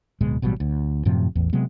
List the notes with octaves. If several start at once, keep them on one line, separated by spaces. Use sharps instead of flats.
D1 B2 G#3
A1 B2 F#3 G3
D2
F#2 A2 C3 F3
A1 E2
C3 F#3 G#3 B3